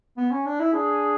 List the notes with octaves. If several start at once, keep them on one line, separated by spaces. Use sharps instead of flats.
B3
C#4
D4
E4
D4 G#4